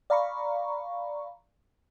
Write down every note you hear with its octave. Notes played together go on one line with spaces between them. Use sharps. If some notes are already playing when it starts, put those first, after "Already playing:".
D5 F5 A#5 B5 C#6